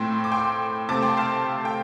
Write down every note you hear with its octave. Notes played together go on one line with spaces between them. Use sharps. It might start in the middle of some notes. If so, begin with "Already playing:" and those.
Already playing: A2 A3 C4 G5 C6
D6
G5 C6
C3 A3 C4 A5 D6
G5 C6
F5 A5
G5